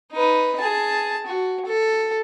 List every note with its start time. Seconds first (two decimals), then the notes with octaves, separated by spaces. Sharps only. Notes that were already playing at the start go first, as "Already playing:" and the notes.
0.13 D#4 B4
0.60 G#4 A5
1.26 F#4
1.65 A4